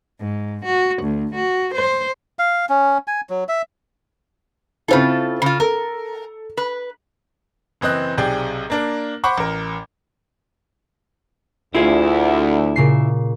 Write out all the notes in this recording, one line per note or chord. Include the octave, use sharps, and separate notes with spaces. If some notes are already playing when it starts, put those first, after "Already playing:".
G#2
F#4
D2
F#4
C5
F5
C#4
G#5
F#3
E5
C#3 C4 E4 F4 A4
C#3 F4
A4 A#4
B4
F#1 E3 C4 D#5 F#6
B1 C3 G#4 D5 G5
A#3 D4 A#4
C5 F#5 B5 C#6 D6
A1 A#4
D2 E4 F4 G#4
A#2 C#3 C7